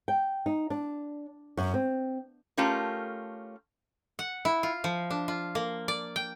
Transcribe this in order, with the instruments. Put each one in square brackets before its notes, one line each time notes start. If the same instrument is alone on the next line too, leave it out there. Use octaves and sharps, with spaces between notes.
[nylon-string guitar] G5
D#4
D4
F#2
C4
[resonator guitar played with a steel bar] A3 C#4 F4 G4 A#4
[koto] F#5
E4
F4
F3
D4
F4
A#3
D5
G5